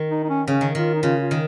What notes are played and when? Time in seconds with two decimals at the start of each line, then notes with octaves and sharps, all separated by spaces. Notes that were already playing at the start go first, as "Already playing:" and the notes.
Already playing: D#3
0.11 D#4
0.24 D#4
0.29 C#4
0.47 C#3 C#4
0.61 D#3
0.75 D#3 F4
0.94 D#4
1.03 C#3 F4
1.22 F4
1.31 D#3